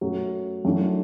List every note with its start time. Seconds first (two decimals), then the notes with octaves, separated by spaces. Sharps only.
0.01 F#2 F#3 A3
0.65 F#2 E3 A3 D4 F#4